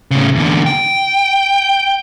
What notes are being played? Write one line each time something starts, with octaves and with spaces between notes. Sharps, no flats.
A2 C#3
E2 D3
G5